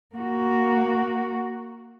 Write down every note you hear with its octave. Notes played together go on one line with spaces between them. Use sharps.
A#3 F#4